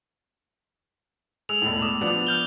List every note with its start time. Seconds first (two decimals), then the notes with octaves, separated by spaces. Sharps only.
1.49 G#3 E6 F7
1.62 E1 A2
1.82 D6 D#6
2.01 F3 B3 D4
2.27 F6 G6 G7